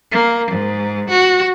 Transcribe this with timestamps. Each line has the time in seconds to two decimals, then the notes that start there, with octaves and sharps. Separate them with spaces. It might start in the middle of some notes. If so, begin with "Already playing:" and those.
0.12 A#3
0.51 G#2
1.10 F#4